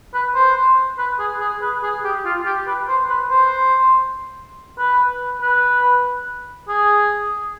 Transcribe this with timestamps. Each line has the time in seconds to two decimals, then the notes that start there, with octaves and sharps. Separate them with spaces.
0.14 B4
0.35 C5
0.98 B4
1.19 G#4
1.40 G#4
1.61 B4
1.83 G#4
2.04 G4
2.25 F4
2.45 G4
2.67 B4
2.88 C5
3.09 B4
3.30 C5
4.78 B4
5.42 B4
6.68 G#4